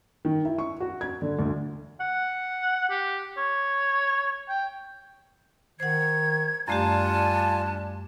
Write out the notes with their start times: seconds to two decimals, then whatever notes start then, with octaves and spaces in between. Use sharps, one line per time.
0.25 D#3
0.45 E4
0.58 C#6
0.80 F#4
1.01 G#6
1.22 D3
1.39 D2
2.01 F#5
2.90 G4
3.38 C#5
4.49 G5
5.80 D#3 C5 F#5 G#6
6.68 F#2 G3 A3 D4 F4 G4 G#5 A5